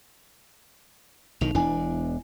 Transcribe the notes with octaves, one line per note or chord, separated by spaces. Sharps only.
B1 D#3 D#4 F7
E1 E2 D4 E4 G#5